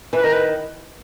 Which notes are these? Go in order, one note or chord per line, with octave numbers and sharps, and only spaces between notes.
E3 B4
D#3 A#4
B4